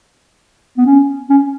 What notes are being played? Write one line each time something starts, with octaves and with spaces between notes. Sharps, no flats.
B3
C#4
C#4